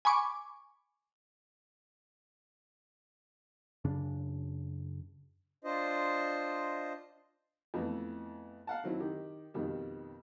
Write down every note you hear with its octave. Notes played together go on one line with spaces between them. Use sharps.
G#5 B5 C#6 D6
F#2 C#3 D4
D4 F4 C5 D#5
F2 E3 A3 B3
F5 F#5 A5
D#3 F#3 C4 E4
D#3 G4
F2 B2 D#3 G3